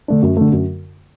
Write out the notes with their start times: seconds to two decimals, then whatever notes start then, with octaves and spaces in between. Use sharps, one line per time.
0.08 D3 A3 D4
0.22 F#2
0.37 D3 A3
0.52 F#2